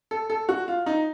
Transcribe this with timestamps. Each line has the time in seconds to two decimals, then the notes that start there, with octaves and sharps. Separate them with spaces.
0.11 A4
0.30 A4
0.49 F#4
0.68 F4
0.86 D#4